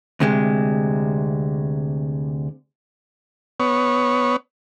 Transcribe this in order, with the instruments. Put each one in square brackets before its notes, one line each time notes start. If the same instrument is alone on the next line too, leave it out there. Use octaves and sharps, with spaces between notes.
[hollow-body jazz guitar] D2 C3 G#3
[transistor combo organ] B3 C#5